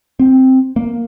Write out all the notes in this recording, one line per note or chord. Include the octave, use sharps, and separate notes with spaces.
C4
A#3